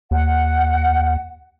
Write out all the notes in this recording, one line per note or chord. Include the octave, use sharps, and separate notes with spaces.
D#2 F#5